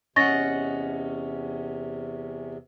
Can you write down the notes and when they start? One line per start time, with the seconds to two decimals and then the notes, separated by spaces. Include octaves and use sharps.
0.16 E2 C3 C#4 D#5 F#5 C#6 A6 A#6